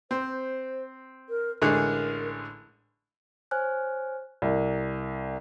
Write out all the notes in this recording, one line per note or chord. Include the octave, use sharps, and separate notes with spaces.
C4 C5
A#4
A1 D3 G#3 A#4
C5 C#5 G#5 F6 F#6
C2